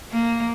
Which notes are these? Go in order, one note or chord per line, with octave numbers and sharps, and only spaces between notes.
A#3